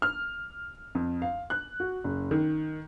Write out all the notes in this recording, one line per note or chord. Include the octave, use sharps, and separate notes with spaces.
F6
F2
F5
F#6
F#4
F#1
D#3